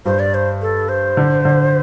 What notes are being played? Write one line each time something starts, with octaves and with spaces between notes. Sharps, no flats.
G2 C5
D5
C5
A4
C5
D3
D3